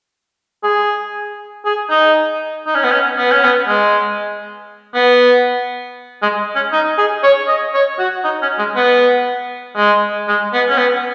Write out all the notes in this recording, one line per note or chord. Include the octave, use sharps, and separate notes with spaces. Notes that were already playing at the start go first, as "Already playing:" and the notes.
G#4
G#4
D#4
D#4
C#4
B3
C#4
B3
C#4
B3
G#3
B3
G#3
C#4
D#4
G#4
C#5
D#5
C#5
F#4
D#4
C#4
G#3
B3
G#3
G#3
B3
C#4
B3